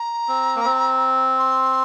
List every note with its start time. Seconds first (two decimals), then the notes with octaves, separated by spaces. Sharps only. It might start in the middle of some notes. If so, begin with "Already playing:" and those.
Already playing: A#5
0.28 C4
0.56 A#3
0.65 C4
1.38 C6